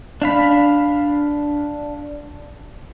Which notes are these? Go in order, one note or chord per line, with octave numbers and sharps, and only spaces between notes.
D4 F5 B5